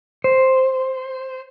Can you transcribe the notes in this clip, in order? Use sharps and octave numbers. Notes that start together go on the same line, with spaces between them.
C5